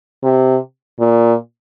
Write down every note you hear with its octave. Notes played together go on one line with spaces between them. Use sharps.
C3
A#2